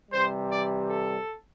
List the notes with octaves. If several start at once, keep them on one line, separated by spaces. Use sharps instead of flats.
C3 E3 G3 C5
D5
A4